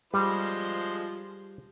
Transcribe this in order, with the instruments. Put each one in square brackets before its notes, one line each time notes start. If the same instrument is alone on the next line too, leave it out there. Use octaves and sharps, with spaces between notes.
[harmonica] F3 G#3 C5 [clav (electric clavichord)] G3